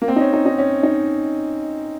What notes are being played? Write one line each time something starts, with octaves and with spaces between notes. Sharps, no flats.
A#3
C4
D#4
C#4
D#4
D#4
C#4
D#4